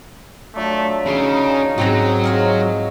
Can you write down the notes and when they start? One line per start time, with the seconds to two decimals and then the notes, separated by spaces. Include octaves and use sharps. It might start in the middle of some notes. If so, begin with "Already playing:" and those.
0.55 F#3 A3 D4 F4
1.06 C#3 D#4 B5 C6
1.78 G#2 F#3 C4 A#5
2.24 F4 G#4 A#4 C#5 D#5